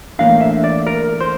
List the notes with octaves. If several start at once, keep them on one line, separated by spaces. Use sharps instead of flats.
A2 E3 A#3 D4 F5
E5
D5
A#4
C5